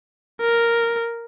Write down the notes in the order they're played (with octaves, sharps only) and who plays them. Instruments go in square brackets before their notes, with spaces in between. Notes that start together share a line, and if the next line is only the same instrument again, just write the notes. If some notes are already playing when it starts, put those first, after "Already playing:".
[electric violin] A#4